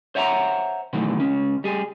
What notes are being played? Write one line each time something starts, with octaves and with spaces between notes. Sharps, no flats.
C5 C#5 E5 F#5 G#5 A#5
B2 D#3 E3 F#3 A3
C#2 C#4
G3 G#4